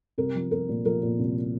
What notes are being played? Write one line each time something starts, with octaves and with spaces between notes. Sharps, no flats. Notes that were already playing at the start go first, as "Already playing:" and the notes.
C2 A#4
F3
C2 A#4
A#2
F3 A#4
A#2
C2